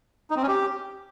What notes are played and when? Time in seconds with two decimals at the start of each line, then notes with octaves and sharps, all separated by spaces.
0.31 D#4
0.36 C4
0.42 C#4
0.48 G4